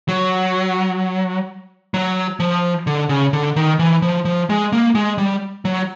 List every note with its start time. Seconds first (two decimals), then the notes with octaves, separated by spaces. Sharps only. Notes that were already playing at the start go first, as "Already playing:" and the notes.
0.08 F#3
1.94 F#3
2.40 F3
2.87 D3
3.09 C#3
3.33 D3
3.56 D#3
3.79 E3
4.02 F3
4.25 F3
4.49 G#3
4.73 A#3
4.95 G#3
5.18 G3
5.65 F#3